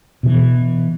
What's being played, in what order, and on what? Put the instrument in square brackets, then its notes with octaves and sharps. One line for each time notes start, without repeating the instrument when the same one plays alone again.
[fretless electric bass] B2 E3